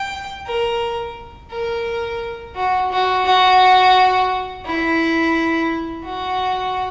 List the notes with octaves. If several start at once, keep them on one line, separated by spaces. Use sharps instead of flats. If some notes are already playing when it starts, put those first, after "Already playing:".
Already playing: G5
A#4
A#4
F#4
F#4
F#4
E4
F#4